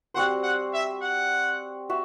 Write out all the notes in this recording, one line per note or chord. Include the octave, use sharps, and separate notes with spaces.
G3 C4 F#4 C5 F#5
F#5
E5
F#5
F#4 E5